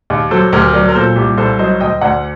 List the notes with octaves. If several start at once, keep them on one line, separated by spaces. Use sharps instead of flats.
D#2
F#3 A4 C5
D2 G4 A#4
F#3 A#4 D5
A#4
A#2 A4 C5
C2 G4
C2 A4 C5
F#3 C5 D#5
D2 D#5 G5
D2 D5 F#5